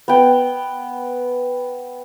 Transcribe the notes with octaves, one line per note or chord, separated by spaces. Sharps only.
B3 G5